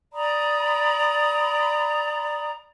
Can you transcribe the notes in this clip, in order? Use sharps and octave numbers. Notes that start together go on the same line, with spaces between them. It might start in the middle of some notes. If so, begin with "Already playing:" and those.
D5 A#5 B5 D#6